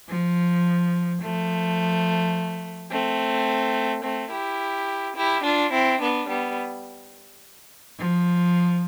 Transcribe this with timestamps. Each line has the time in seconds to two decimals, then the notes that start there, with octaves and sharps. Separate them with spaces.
0.09 F3
1.22 F3 A3
2.90 A3 C4
4.03 A3 C4
4.31 E4 G4
5.16 E4 G4
5.44 D4 F4
5.72 C4 E4
6.01 B3 D4
6.29 G3 B3
7.98 F3